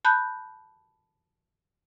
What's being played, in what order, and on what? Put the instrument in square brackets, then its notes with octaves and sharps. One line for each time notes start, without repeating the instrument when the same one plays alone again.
[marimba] A5 B5 F#6 G6